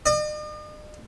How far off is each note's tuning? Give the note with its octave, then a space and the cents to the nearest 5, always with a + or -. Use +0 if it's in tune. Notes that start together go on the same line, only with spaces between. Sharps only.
D#5 -45